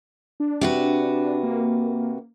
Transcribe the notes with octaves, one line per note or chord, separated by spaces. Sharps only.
D4
C3 F#4 B4
A#3